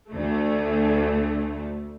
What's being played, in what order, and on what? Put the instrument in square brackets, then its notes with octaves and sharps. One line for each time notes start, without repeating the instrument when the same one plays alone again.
[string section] D2 A3